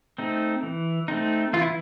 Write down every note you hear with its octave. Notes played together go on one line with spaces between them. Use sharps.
A3 C4 D#4
E3
A3 C4 D#4
E3 F4
E4